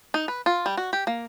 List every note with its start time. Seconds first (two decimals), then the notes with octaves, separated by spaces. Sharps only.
0.14 D#4
0.28 B4
0.46 F4
0.66 G3
0.77 F#4
0.93 G4
1.07 A#3